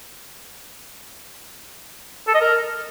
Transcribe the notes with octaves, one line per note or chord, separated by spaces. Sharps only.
A4
D#5
A#4